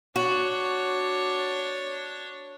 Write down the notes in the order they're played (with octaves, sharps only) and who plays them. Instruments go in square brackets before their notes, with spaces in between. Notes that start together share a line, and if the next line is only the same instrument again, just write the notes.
[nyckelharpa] D4 C#5 [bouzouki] F#4